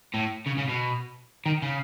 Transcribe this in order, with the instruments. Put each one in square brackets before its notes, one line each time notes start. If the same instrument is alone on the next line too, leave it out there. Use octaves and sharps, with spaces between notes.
[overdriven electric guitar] A2
C#3
C#3
B2
D#3
C#3